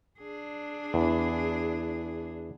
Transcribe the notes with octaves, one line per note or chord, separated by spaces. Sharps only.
D4 G#4
E2